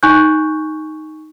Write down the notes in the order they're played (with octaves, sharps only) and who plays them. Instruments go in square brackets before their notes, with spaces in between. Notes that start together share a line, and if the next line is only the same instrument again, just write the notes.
[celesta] D#4 G#5 C#6 F#6 G6